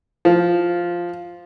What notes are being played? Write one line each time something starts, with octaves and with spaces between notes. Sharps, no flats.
F3